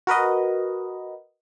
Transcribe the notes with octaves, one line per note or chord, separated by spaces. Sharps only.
F#4 A#4 B4 D#5